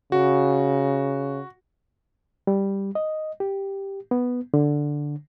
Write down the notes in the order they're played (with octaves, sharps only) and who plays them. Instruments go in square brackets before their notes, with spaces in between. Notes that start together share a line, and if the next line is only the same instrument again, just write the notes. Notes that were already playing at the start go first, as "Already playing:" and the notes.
[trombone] C#3 [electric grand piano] F#4
[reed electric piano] G3
D#5
G4
B3
D3